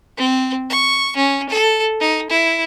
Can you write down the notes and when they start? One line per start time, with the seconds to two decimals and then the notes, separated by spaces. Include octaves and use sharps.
0.17 C4
0.69 C#6
1.16 C#4
1.49 A4
2.01 D#4
2.30 E4